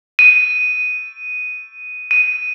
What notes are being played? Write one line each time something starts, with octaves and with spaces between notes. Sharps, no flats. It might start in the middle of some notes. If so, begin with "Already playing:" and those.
D#7
D#7